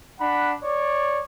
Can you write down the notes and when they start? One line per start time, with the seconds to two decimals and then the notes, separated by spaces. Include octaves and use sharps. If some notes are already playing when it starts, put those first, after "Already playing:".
0.20 D4 F#5 B5
0.62 C#5 D5